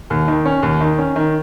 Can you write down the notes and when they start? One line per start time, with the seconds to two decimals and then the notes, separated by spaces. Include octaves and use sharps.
0.10 D#2
0.28 D#3
0.46 C#4
0.63 D#2
0.81 D#3
0.98 C#4
1.16 D#3